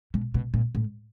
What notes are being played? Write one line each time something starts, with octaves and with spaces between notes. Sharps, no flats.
B2
B2
A#2
A2